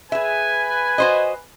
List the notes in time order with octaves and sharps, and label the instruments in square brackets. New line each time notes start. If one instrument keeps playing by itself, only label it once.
[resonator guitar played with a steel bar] G#4 E5 [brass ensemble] B4 G#5
[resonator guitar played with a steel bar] F#4 C5 D#5